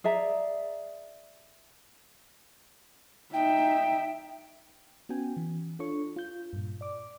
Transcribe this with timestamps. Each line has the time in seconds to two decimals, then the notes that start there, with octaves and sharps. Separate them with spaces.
0.04 G#4 D5 E5 A#5
3.34 D#4 E5 G5
5.09 B3 C#4 F#4 G5 G#5
5.37 E3
5.79 D4 F4 A4 C#5 C#6
6.16 F4 G6
6.53 G2 A#2
6.81 D5 D6